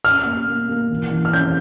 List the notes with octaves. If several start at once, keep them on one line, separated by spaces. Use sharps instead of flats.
C#4 F6
A#3
A#3
A#3
E3
E3
F6
C#4 G6